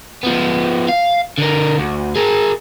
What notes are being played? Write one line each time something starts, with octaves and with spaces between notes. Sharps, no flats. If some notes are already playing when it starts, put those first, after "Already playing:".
F3 B3
F5
D3 A#4
D2
G#4 A#4